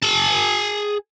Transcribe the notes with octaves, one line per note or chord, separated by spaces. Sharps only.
G#4 A5